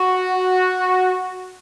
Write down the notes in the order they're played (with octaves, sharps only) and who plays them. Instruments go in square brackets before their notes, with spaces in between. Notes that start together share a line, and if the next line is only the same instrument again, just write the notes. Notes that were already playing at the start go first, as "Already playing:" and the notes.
Already playing: [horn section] F#4